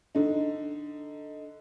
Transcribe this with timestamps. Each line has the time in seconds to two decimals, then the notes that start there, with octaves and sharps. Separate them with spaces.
0.15 D3 D#4